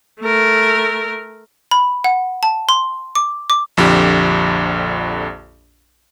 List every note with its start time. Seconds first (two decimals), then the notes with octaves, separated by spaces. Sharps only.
0.21 A3 A#4
1.71 B5
2.04 F#5
2.43 A5
2.69 C6
3.15 D6
3.50 D6
3.77 A#1 F2 D3 G4